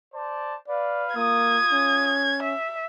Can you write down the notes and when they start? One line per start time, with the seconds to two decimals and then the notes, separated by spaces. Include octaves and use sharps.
0.13 C5 D5 A5
0.68 B4 D5 F5
1.16 A#3 F4 D#6 G#6
1.72 C#4
2.43 E5